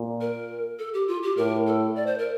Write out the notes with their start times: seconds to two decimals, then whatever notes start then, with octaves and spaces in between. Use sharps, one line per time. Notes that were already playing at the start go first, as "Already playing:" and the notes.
Already playing: A#2
0.21 A#4
0.79 A4
0.94 G4
1.08 F4
1.23 G4
1.37 A2 A#4
1.67 A4
1.96 D5
2.06 C5
2.18 A#4